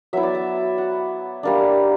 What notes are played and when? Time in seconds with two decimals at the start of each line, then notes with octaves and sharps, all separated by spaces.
0.13 F#3 B3 E4 E5
0.23 D5
0.35 E5
0.78 F#5
1.43 G3 A#3 D4